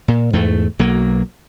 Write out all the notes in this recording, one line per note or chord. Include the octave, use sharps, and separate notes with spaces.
A#2
E2 G#2 A3
B1 F#3 A#3